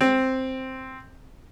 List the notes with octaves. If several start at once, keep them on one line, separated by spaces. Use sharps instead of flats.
C4